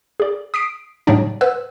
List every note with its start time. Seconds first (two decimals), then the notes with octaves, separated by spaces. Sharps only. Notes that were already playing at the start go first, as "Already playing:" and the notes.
0.20 G#4 D5
0.54 D#6 B6 C7 D7
1.07 A2 C#3 F#3 G3 D4 D#4
1.41 B4 C5 F#5 E6 F#6